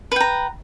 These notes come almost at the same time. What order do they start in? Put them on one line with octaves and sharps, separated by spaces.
B4 G5 A#5